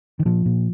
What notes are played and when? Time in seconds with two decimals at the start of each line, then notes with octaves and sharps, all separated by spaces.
0.19 D#3
0.25 A#2 F3
0.45 A#2